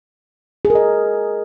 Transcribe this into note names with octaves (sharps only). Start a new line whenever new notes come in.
G#4
A#4
D#5